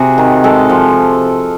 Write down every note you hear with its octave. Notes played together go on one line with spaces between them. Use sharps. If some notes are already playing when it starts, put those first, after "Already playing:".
Already playing: C3 F#4 G#4
D#3
G#3 A4
F3